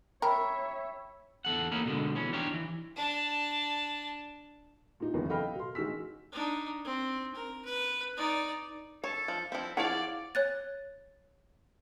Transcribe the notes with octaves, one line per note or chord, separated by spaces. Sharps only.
A#4 C#5 E5 G5 B5
E2 A4 F#5
A#3 C#4 D#4 E4
B2 D3 G#3
E3 C#4
D4 D#4 F4 G4 C#5
E3
D4 A5
A#2 D#4
F#1 E2 C3 B3
A4 D#5 F5 G5 B5 F6
B2 C6
A1 D#4 F#4 G#4 E6 B6
D4 D#4
C4
A#4
B4
D#4 D5
A4 C#5
F3
F3 C4 E4
F3 E4 G#4 C#5 D5 F5 F#5
C#5 F#6 A6